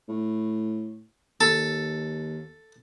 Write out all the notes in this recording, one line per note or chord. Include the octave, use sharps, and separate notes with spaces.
A2
D#2 A4